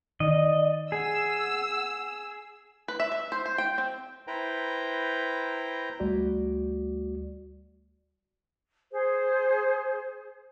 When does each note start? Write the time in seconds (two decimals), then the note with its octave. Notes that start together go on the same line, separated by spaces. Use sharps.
0.20 D#3 D5 D#5
0.92 G#4 F#5 E6
2.88 B4
3.00 E5
3.12 E5
3.32 C5
3.46 C5
3.58 G5
3.78 C4
4.27 E4 B4 C5 G5 A#5
6.00 D2 G3 A3 F#4 D5
8.92 G#4 C5